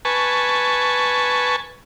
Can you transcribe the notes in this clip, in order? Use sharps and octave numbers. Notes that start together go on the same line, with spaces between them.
B4 G#5 A5 C#6